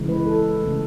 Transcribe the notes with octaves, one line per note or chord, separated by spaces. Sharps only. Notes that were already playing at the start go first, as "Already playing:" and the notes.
Already playing: C#3 E3 G#3
B4
A4
C#3 E3 A3